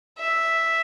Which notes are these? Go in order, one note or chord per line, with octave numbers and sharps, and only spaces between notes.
E5